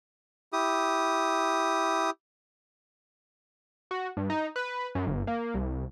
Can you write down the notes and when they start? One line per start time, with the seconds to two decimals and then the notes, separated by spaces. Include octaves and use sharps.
0.53 E4 G4 D#6
3.91 F#4
4.17 G2
4.30 D#4
4.56 B4
4.95 F#2
5.07 G1
5.27 A#3
5.54 C2